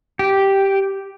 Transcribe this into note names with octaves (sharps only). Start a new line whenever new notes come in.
G4